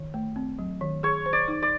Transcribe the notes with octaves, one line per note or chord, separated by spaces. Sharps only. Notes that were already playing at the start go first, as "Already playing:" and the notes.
Already playing: D#3
A3
C4
F#3
D#3
G#4 C#5
C5
D5
D#4
D5